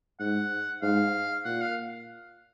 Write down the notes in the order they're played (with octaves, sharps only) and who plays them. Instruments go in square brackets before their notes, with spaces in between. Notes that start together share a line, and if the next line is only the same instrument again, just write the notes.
[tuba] G#2 [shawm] F#5
[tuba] G#2 [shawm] F5
[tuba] A#2 [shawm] F#5
[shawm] F5